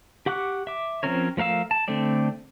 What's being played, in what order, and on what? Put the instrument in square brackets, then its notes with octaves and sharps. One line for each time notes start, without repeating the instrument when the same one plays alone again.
[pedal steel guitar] G4 F#5 C#6 D6 F#6
E5 D6
F3 C4 C#4 A#4 C#5
F3 A3 A#4 F5 E6
A5
D3 A3 C4 D5